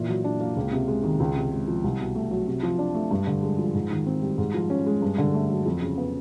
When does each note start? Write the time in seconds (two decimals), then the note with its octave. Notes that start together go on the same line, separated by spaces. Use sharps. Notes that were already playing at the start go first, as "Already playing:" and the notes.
Already playing: A#2 E3
0.09 F#3
0.24 D4
0.41 A#3
0.56 C#2
0.72 C3
0.88 G#3
1.04 D#3
1.20 C#2
1.36 C3
1.52 G#3
1.68 F3
1.84 C2
2.00 B2
2.15 A3
2.31 F#3
2.47 C3
2.63 F3
2.79 D4
2.95 A3
3.11 G2
3.27 D3
3.43 G#3
3.58 F3
3.74 G#2
3.91 D#3
4.06 C4
4.22 G3
4.38 G#2
4.54 F3
4.70 C#4
4.86 G#3
5.02 G2
5.18 D3
5.34 A3
5.50 F#3
5.66 F2
5.81 C#3
5.98 B3